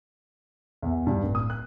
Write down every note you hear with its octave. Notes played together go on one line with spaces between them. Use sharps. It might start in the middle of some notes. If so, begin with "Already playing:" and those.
E2
G2
D1
D#6
F#6